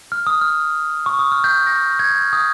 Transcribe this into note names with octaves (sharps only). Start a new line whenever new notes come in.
F6
D#6
F6
C#6
D#6
F6
G6
A#6
G#6
G6
F6
D#6